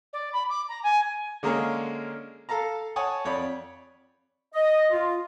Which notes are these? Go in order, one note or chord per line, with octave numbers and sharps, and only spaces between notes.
D5
B5
D6
A#5
G#5
D3 G#3 A#3 C#4 G#4 C#5
A4 F5 A5 A#5
C#5 F#5 G#5 A5 C#6 D#6
F2 C#5 D5 B5
D#5
F4